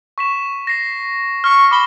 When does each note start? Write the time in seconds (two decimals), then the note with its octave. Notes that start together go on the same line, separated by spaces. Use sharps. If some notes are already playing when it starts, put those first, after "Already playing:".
0.18 C#6 B6 E7
0.67 A#6 C7 E7
1.44 C#6 F6
1.71 B5 D6 G7